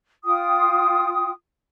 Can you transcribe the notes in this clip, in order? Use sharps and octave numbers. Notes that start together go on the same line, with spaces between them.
F4 G5 D#6